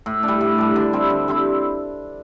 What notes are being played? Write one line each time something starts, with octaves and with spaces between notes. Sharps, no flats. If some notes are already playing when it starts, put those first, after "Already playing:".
A2
D4
G3
A2
G3 D4
D3
G3 C4 E4
D3
G3 C4 E4